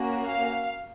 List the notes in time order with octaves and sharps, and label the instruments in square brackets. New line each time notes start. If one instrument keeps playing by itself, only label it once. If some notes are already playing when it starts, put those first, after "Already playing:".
Already playing: [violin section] A#3 C#4 F#4
F5